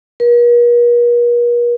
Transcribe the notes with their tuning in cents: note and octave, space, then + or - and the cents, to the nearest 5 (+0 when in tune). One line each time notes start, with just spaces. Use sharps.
A#4 +45